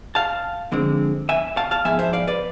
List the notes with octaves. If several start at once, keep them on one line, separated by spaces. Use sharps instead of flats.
F5 A5
F2 D3 G#3 C4
E5 G#5
F5 A5
F5 A5
G#2 F3 B3 E5 G#5
C5 E5
D5 F5
B4 D5